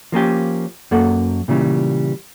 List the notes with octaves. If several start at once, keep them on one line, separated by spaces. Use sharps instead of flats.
F3 A#3 C#4 G4
F#2 A#3 A4 F#5
A#2 C#3 E3 G3